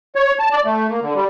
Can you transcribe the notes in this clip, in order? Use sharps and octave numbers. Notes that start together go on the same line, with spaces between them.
C#5
A5
D5
A3
A#3
D3
G3